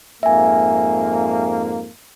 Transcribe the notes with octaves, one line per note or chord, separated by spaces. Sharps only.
F2 G#2 A#3 E5 G#5